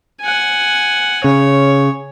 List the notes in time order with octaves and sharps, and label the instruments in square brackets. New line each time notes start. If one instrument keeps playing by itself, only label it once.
[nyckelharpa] F#5 G#5
[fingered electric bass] C#3 [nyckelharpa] C#5